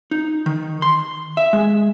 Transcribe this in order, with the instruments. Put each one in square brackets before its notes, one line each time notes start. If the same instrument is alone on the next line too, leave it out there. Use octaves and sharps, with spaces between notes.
[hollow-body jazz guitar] D#4
D#3
C6
E5
G#3